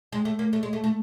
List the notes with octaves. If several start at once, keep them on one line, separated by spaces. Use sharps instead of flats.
G#3
A3
A#3
A3
G#3
A3
A3